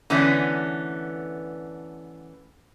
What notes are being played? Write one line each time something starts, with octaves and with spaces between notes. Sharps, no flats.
D3 E3 A3 B3 C#4